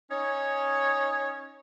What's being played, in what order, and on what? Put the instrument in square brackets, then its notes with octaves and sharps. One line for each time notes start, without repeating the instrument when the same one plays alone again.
[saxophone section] C#4 D#4 C#5